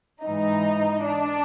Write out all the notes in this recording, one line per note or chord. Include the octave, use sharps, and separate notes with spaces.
G#2 E3 D#4
D4